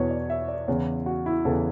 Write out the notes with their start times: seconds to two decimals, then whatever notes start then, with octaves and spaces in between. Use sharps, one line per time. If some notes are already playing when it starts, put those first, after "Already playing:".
Already playing: E2 B2 B4 C#5
0.10 D5
0.30 E5
0.48 D5
0.68 E2 C#3 E3 C#5
1.06 F#4
1.26 E4
1.45 E2 C#3 E3 A4